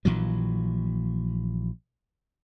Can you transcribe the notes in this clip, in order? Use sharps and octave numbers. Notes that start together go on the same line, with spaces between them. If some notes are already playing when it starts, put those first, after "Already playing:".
A#1 A#2 E3 F#3